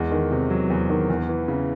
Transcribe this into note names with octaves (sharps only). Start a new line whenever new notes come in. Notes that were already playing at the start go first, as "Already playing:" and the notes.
Already playing: E2 G#3
D#3
C3
F#3
E2
D#3
E2
E3
C#3